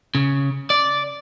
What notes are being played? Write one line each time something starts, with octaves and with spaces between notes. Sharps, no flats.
C#3
D5